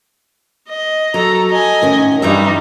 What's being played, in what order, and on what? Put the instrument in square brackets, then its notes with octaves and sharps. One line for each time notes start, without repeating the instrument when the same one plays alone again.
[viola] D#5
[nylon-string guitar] F#3 [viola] A4 A#5
[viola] D#5 G#5
[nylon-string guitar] A2 D#3 C#4
[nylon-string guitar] G2 E3 E5 [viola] G3 D#4